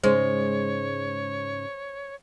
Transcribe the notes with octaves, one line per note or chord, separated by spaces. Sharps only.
G#2 C#3 G#3 C5 C#5